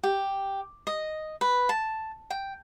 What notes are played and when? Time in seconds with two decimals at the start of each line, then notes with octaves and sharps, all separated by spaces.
0.03 G4
0.87 D#5
1.41 B4
1.69 A5
2.30 G5